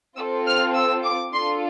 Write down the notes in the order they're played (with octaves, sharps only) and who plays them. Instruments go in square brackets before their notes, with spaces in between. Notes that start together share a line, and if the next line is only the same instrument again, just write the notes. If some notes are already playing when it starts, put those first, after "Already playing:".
[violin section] C4 F4 A4 E6
F6
E6
D6
D4 F4 A4 C6